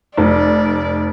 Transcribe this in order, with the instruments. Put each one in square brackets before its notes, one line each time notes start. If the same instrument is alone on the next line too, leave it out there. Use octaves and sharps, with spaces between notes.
[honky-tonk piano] F1 [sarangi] D5